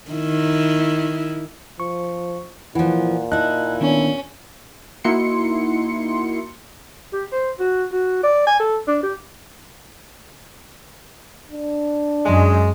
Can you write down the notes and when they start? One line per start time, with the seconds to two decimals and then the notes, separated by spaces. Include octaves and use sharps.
0.11 D#3 E4
1.80 F3 C#6
2.75 A#2 E3 F3 E4 F#5
3.32 D#4 E4 D#5 A5 F#6
3.81 D#3 B3 C#4 D4
5.04 A#3 D#4 E4 F#4 C6 C#7
7.13 G4
7.32 C5
7.60 F#4
7.92 F#4
8.24 D5
8.47 G#5
8.60 A4
8.88 D4
9.03 G4
11.52 D4
12.26 F#2 G#3